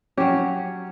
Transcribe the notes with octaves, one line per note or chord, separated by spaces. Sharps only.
F#3 C#4 G4